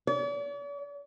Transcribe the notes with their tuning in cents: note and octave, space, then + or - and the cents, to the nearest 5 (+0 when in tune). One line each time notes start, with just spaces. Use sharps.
D5 -45